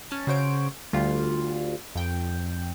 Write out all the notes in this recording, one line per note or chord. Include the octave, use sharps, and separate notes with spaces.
C#4 A5
C#3 F#4 C5 C#5 D7
D2 G3 F4
F2 G5